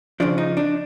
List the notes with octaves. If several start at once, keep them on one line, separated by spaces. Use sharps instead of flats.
C#3 F3 D4
D#4
D4